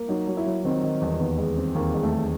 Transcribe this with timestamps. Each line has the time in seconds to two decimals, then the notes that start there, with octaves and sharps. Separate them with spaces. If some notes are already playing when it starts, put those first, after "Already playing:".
Already playing: A#3
0.08 F#3 D#4
0.27 F#3
0.37 E4
0.46 F#3
0.64 D#3 C4
0.83 D#3
1.01 E2
1.19 D#2 B3
1.38 G#3
1.57 C4
1.75 D#2 A#3
1.94 G#3
2.03 A3
2.13 G#3